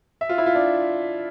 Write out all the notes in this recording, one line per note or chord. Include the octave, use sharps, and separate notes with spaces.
E5
F4
E4
F4
D4